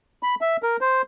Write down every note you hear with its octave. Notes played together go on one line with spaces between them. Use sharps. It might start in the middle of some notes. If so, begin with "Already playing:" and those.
B5
E5
A#4
C5